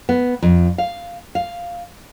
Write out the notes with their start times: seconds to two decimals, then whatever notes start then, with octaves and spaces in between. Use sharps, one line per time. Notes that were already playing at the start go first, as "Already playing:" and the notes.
0.09 B3
0.42 F2
0.78 F5
1.35 F5